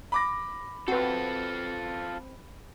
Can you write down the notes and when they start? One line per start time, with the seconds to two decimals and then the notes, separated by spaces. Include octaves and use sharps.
0.12 B5 D6 A#6
0.88 C4 F4 F#4 A4 B4